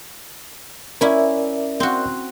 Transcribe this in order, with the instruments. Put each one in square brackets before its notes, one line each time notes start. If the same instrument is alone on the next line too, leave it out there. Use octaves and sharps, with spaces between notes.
[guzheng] C#4 E4 [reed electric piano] A#4 D5 E5
[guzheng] C4 F#4